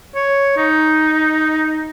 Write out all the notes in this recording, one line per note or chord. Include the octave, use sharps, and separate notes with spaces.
C#5
D#4